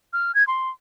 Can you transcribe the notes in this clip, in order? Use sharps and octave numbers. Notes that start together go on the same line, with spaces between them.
F6
G#6
C6